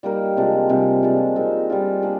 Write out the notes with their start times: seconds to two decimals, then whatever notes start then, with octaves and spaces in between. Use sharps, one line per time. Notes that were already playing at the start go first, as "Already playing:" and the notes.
0.03 G3 A#3 D#4 A#4
0.36 C3 F3 G#3 D4
0.69 C3 G3 D4 G4
1.03 F3 G#3 D4
1.36 G#3 C4 D#4 A#4
1.69 G3 D4 F4
2.03 A#3 D4 G#4